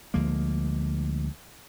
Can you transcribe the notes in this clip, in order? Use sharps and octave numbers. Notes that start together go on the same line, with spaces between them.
D2 F3 G#3 A#3